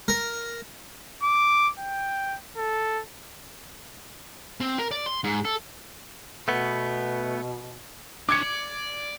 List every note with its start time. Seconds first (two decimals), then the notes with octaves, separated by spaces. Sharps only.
0.08 A#4
1.23 D6
1.79 G5
2.57 A4
4.61 C4
4.79 A#4
4.91 D5
5.06 C6
5.24 G#2
5.45 A4
6.48 B2 A3 B3
8.29 D4 C#5 D6 G#6 C#7
8.43 D5